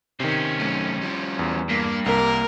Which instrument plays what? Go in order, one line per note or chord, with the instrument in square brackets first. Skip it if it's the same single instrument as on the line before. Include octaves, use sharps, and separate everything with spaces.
[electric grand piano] C3 D#3 [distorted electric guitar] C#4 C5
[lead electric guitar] F#2 A3
F3 G3
[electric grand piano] E2
[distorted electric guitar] G2 [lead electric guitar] A#3
[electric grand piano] C2 [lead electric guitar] A#3 [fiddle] A#4